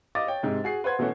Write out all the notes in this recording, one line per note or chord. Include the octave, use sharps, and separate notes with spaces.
D#5 F5 D6 A6
C#5 G5
G#2 C3 G#3
F#4 G#4 C7
B4 C5 F#5 C6 G#6
B2 E3 A3 C#4 F#4